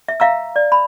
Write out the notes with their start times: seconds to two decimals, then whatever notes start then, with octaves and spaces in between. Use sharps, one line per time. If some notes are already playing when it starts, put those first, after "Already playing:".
0.08 E5
0.20 E5 F5 A#5 E6
0.56 D5
0.72 B5